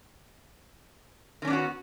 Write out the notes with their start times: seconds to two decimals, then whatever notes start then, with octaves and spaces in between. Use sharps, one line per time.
1.42 D#3
1.45 C#4
1.47 D4
1.50 B3
1.53 F#4